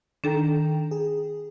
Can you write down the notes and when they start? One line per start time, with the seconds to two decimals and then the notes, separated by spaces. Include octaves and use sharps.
0.24 D#3 D4 A4 G5 A#5
0.91 G#4